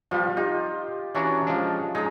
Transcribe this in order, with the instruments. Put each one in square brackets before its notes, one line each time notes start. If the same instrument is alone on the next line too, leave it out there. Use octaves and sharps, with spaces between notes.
[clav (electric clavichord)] F3 G3 B3 [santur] F4
[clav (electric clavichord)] D#4 [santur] G4
[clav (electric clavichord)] E3 D4 F#4 [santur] C#4 A#5
[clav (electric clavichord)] F3 G#3 D4
[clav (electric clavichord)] G#3 D#4 [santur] G#4 A#5